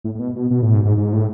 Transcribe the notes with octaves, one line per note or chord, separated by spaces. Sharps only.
A2
A2
B2
B2
B2
A2
G#2
G#2
G#2
A2